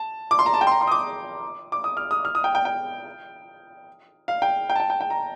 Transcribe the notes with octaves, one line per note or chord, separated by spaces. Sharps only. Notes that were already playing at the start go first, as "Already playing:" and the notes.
Already playing: A5
D6
C6
A#5
A5
G5
C6
A#5
C6
D#6
D6
D6
D#6
F6
D#6
F6
D#6
G5
G5
G5
F5
G5
G5
A5
G5
G5
G5
A#5